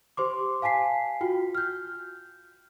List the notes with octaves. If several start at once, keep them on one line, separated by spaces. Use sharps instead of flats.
G4 C5 C6 D6
F5 G#5 A5 B6 C7
F4 F#4 G5
F6 G6